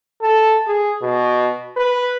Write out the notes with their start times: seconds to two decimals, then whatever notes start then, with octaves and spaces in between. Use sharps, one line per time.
0.22 A4
0.67 G#4
1.02 B2
1.77 B4